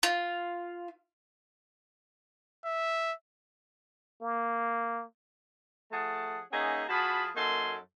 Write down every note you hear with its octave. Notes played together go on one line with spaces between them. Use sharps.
F4
E5
A#3
F3 A3 G#4 F#5 A5
A#3 C#4 D#4 G#4 E5 F#5
F3 F#4 G#4 A5 B5
F#2 A#3 D#4 A4 G#5 C6